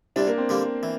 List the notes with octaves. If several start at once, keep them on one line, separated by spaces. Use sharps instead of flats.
C2 C3 G3 D4
A#3
C4
D3 G3 A#3
E3